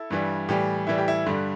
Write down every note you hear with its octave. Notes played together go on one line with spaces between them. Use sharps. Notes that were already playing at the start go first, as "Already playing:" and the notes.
Already playing: E4 A4
G2 E3 G3
A2 E3 G3 G4
A2 E3 G3 E4
G4
E4
G2 D3 G3